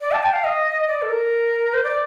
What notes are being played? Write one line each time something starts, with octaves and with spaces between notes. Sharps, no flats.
D5
A5
G5
F5
D#5
D5
A4
A#4
C5
D5